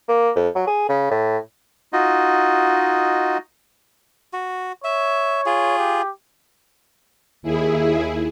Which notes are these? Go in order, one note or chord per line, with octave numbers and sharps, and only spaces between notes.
A#3
F2
F#3
G#4
C#3
A2
D#4 F4 F#4 D#5
F#4
C#5 E5
F4 G#4
G4
D#2 E4 G#4